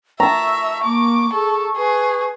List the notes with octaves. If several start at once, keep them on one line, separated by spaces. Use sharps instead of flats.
E5 A5 A#5 C#6
A#3 D6
G#4 A4
G#4 B4